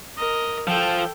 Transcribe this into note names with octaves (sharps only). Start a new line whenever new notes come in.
A#4 D#5
F3 A4 G5